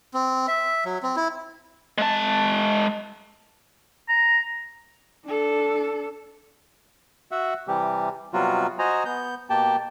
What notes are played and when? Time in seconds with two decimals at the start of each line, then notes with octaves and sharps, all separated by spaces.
0.14 C4
0.48 E5
0.85 F#3
1.03 C4
1.16 E4
1.98 G#3 A5
4.08 A#5
5.25 D4 A4
7.31 F#4 E5 F#5
7.68 C3 E3 G3 G4
8.33 C3 F#3 G3 B3 F4 F#4
8.79 F#4 C5 D#5 G#5 A#5
9.05 B3 G6
9.50 B2 A#3 G4 G5 A5